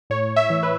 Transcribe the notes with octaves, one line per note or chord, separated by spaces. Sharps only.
A2 C#5
E5
E3
B4